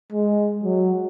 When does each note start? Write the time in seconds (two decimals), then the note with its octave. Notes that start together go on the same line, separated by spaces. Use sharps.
0.13 G#3
0.64 F#3